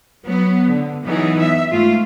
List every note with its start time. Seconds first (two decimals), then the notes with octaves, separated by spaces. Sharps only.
0.23 F#3 B3
0.66 D3
1.03 E3 F#3 B3 D#4 G#4
1.39 E5
1.71 G#2 A3 F4